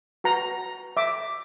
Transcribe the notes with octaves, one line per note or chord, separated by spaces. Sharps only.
F#4 B4 A#5
E5 D6